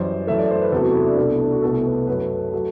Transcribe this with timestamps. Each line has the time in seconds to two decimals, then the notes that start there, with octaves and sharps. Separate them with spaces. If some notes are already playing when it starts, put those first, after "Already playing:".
Already playing: F#2 E3 G3 C5
0.27 F#2 E3 A3 E5
0.38 D5
0.51 C5
0.62 B4
0.72 E2 C3 F#3 A3 A4
0.83 F#4
0.95 E4
1.07 D4
1.17 C2 B2 A3 D4
1.41 D4
1.52 F#4
1.62 C2 B2 A3 A4
1.77 A4
1.85 B4
2.07 F#2 F#3 A3 B4
2.53 F#3 A3